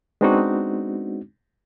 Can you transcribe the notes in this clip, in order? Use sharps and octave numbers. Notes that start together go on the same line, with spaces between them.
G#3 B3 C4 D4 D#4 F#4